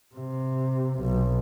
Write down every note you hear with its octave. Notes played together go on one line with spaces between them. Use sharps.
C3
B1